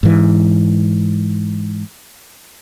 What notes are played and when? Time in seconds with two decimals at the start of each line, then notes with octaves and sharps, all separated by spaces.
0.03 G#2 E3